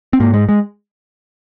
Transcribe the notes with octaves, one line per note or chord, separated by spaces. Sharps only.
C4
G#2 A#3
G#3
G#3